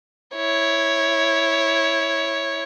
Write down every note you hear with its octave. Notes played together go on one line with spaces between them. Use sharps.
E4 C#5